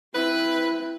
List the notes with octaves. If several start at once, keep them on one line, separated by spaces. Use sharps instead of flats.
C4 E4 B4